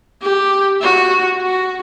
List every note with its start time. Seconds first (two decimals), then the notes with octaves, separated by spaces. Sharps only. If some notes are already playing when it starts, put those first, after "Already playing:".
0.22 G4
0.82 F#4
1.41 F#4